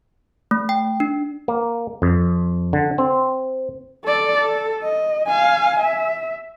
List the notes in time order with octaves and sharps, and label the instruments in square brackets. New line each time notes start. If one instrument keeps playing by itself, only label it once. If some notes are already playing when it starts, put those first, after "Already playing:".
[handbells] A3
G5
D4
[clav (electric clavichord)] A#3
F2
D3
C4
[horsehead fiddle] A4 D5
A4
D#5
F5 G#5
E5